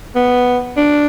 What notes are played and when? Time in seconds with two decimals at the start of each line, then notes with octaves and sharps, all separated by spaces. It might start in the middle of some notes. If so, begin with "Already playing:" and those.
0.15 B3
0.77 D4